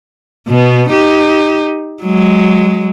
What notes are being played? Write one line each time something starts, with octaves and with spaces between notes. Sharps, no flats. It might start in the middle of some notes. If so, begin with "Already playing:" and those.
B2 B3
D#4 G4
F#3 G#3